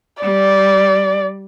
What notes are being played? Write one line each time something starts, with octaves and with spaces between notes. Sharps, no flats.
G3 D5